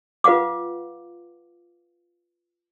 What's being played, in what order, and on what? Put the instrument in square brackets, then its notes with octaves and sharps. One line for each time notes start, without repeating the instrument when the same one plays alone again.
[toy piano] F4 B4 F5 F#5 D6